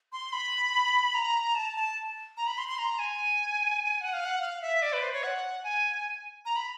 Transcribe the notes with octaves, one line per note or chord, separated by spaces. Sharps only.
C6
B5
A#5
A5
A5
A#5
B5
C6
C6
A#5
G#5
F#5
F5
F#5
F5
E5
D5
B4
C5
C#5
F#5
G#5
A#5
B5